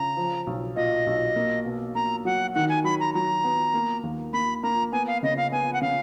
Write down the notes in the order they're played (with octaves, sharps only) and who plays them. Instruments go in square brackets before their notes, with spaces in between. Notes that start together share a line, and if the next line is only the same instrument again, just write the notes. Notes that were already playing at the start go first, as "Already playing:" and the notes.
Already playing: [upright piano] C#3 [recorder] A#5
[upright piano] F3
B1
[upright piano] A#2 [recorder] D#5
[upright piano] B1
A#3
B2
[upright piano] A#3 [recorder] A#5
[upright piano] F#3 [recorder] F#5
[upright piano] D#3 [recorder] F#5
[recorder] G#5
[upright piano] F#3 [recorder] B5
[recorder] A#5
[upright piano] F#3 [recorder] A#5
[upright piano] B3
A#3
D#2
[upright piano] A#3 [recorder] B5
[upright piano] A#3 [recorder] A#5
[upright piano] B3 [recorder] G#5
[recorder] F5
[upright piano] C#3 [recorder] D#5
[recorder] F5
[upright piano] B3 [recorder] G#5
[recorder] F#5
[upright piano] C#3 [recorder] F5